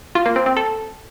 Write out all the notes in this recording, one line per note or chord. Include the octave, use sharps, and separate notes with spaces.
F4
A#3
C4
C4
A4